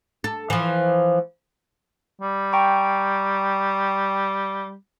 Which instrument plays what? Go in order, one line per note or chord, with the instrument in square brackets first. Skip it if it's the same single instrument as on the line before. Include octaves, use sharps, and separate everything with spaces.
[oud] A4
E3 F3
[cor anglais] G3
[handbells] G5 A#5 C#6